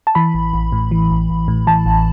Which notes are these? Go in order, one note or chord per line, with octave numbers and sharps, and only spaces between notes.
A5
E3 B5
A1
A1
A2
E3
A1
A1
A2
E3 A5
A1